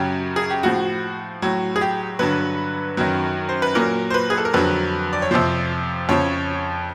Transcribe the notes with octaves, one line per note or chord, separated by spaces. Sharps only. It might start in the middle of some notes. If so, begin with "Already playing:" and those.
Already playing: F#2 C#3 F#3 G4
G#4
G4
A2 F3 F#4
A2 F#3
G#4
G4
G2 D3 F#3 B4
F#2 D#3 F#3
C5
B4
A#2 F#3 A#4
C5
B4
G#4
A4
A#4
F2 D3 F#3 B4
D5
C#5
F2 C3 F3 C5
F2 C#3 F3 C#5